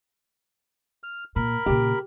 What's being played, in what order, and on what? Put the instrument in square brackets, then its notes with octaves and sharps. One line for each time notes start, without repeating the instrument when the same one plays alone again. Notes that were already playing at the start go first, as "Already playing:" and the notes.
[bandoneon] F6
[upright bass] A#2 [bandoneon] A#4 B5
[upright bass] A#2 C#3 [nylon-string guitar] G4